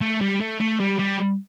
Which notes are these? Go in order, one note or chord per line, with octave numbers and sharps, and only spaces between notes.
A3
G3
A3
A3
G3
G3